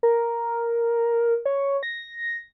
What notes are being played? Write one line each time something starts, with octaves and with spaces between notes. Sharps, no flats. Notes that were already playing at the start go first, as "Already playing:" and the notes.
A#4
C#5
A#6